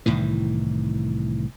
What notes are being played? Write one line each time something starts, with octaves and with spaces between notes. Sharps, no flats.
C2 A2 D#3 E3